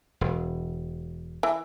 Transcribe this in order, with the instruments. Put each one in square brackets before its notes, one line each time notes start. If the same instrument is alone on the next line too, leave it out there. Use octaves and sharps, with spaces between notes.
[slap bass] E1
[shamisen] E3